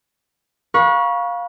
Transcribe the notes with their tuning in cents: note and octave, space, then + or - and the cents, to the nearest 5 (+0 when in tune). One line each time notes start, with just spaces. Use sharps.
B4 -40 F5 +15 C#6 +0